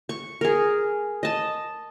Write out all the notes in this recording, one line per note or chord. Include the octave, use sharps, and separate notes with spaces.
C#6
G#4 A#4
D#5 A5